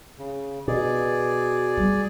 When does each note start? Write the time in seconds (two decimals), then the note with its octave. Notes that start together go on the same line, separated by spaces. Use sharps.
0.19 C#3
0.68 B2 G#4 D5
1.77 G3